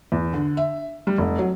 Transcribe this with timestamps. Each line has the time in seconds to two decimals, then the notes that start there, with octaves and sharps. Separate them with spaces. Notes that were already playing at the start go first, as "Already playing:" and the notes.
0.12 E2
0.33 D3
0.57 E5
1.07 G3
1.18 F1
1.38 F#3